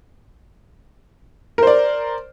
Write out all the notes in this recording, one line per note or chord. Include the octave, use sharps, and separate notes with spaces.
A#4 C5 D5